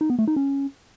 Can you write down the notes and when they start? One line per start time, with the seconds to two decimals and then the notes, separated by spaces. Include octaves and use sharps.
0.01 D#4
0.10 B3
0.19 A3
0.27 D#4
0.36 C#4